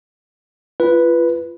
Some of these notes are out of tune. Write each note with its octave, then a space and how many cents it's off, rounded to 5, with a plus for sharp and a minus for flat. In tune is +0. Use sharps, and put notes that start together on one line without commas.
F4 -30 B4 -5